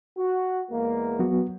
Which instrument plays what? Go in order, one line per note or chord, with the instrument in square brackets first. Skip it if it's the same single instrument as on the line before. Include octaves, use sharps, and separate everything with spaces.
[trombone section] F#4
E2 G#3 A#3
[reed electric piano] F#3 B3 F#4